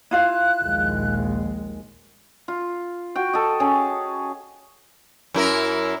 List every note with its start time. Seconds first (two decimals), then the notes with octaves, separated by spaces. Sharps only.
0.11 E4 F4 F5 F#6
0.61 A#1 D#2 G#3
2.48 F4
3.16 F#4 G5
3.33 A4 D#5
3.60 C#4 G#4 A5
5.34 F#2 E4 A#4